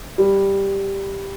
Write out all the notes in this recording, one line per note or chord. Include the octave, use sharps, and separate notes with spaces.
G3